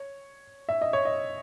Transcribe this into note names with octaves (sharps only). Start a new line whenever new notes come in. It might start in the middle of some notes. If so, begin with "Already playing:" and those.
Already playing: C#5
E5
D#5
C#5
D#5